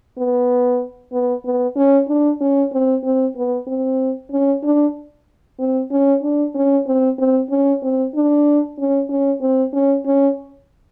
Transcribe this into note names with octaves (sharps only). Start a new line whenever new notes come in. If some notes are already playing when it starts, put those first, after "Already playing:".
B3
B3
B3
C#4
D4
C#4
C4
C4
B3
C4
C#4
D4
C4
C#4
D4
C#4
C4
C4
C#4
C4
D4
C#4
C#4
C4
C#4
C#4